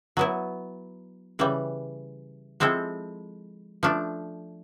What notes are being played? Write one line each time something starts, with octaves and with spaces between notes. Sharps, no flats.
F#3 B3 E4
C#3 E3 G3
F3 G#3 C4 E4 A4
F3 A3 D4